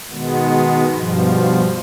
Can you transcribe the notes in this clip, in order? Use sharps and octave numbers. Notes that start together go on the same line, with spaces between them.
B2 D#3 G#3 B3
G2 B2 F3